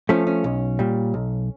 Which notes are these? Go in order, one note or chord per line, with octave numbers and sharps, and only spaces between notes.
F3 A3 C#4
C#4
B1
A#2 G3
B1